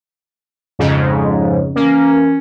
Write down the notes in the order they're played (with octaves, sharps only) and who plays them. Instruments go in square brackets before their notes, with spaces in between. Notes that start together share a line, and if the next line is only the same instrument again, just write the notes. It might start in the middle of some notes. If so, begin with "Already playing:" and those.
[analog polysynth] F2 G#2 C#3
[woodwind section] E3 C#4 [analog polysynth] A#3